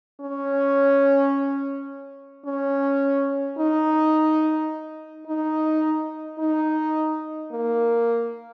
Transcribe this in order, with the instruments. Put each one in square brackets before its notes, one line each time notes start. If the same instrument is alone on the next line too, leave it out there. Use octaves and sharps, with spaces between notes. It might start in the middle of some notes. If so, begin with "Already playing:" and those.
[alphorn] C#4
C#4
D#4
D#4
D#4
A#3